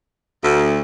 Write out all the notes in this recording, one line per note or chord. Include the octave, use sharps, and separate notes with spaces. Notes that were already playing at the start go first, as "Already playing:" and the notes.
D2